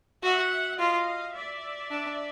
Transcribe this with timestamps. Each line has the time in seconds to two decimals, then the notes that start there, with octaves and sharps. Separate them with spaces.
0.23 F#4 E5 F#5
0.79 F4 D#5 F5
1.35 D5 E5
1.91 D4